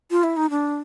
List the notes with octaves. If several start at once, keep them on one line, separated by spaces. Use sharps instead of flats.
F4
E4
D#4
D4